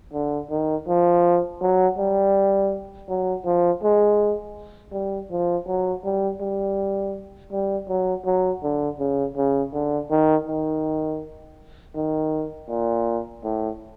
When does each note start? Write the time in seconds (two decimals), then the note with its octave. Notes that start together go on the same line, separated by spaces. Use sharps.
0.13 D3
0.50 D#3
0.88 F3
1.62 F#3
1.98 G3
3.09 F#3
3.46 F3
3.83 G#3
4.93 G3
5.31 F3
5.68 F#3
6.05 G3
6.41 G3
7.52 G3
7.89 F#3
8.25 F#3
8.63 D3
8.99 C#3
9.37 C#3
9.73 D3
10.11 D#3
10.48 D#3
11.96 D#3
12.69 A#2
13.44 A2